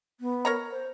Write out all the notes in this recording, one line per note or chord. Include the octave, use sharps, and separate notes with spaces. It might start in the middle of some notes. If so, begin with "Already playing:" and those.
B3
A#4 C#5 A#5
C5